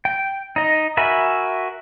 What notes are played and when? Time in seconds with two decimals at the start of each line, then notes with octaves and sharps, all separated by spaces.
0.05 G5
0.56 D#4 D#5
0.97 F#4 A#4 E5 G#5 B5